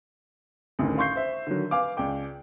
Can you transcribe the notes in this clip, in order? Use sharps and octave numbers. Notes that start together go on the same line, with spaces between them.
A1 D2 A2 D#3
F5 C6 C#6 G6 C7
C5 E5
D3 D#3 F#3
B4 F5 G#5 D6
C#2 D5 G5 D6